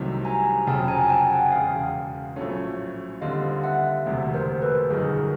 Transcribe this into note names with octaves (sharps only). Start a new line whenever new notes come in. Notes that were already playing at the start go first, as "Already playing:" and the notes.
Already playing: C2 C3 D#3 F#3 A3
G#5 A#5
F1 F2 C#3 F#3 G5 A5
G#5 A#5
G#5
G5 A5
F#5 G#5
E1 E2 C#3 F5 G5
A#1 A2 F#3 A3 C#4
D#2 D3 G3 C4 F4 D#5 F5
E5 F#5
E1 D2 C3
A#4 C5
A4 B4
G1 F#2 D#3 G#4 A#4